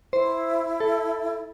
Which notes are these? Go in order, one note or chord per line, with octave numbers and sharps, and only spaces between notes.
E4 C5
A4